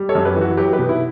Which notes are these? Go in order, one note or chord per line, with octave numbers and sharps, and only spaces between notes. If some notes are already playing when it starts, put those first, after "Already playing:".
Already playing: G3
A4 C#5
F#2
G4 B4
E3
F#4
F#3 G4 B4
G4 B4
B2
E4